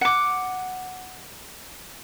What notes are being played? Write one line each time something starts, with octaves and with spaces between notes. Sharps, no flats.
F#5 D6